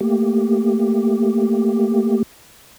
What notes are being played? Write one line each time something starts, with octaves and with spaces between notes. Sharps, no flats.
A3 A#3 G4